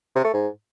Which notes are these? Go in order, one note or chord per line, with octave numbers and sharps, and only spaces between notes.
C3
A3
G#2